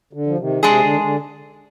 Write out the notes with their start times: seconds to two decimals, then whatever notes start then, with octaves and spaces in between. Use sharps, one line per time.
0.13 D3
0.26 F3
0.38 C3 D#3
0.63 C3 G#3 D4 G#4
0.82 D3
0.92 D#3
1.00 D3